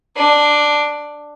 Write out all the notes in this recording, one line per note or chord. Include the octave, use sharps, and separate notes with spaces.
D4